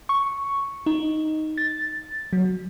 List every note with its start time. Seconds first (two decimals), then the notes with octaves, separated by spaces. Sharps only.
0.09 C#6
0.86 D#4
1.58 A6
2.33 F#3